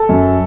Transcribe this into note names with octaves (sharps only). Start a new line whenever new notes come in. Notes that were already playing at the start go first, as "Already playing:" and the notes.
Already playing: A4
F#2